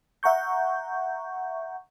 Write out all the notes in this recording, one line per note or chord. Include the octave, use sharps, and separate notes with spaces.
E5 F#5 A#5 C#6 G6